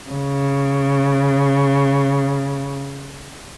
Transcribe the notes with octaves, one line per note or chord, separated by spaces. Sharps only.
C#3